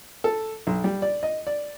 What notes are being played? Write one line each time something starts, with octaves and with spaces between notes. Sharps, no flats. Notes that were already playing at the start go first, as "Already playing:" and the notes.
A4
B1
G3
D5
D#5
D5